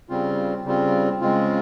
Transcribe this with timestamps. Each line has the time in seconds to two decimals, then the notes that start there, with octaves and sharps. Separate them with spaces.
0.09 C#3 G3 C4 F4
0.65 C#3 G3 C4 F4
1.21 C#3 G#3 C4 F4